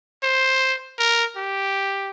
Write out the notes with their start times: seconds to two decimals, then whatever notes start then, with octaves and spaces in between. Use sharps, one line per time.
0.23 C5
0.99 A#4
1.37 G4